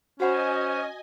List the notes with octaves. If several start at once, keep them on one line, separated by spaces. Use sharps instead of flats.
C#4 F#4 C5 D#5 F#5 G#5 B5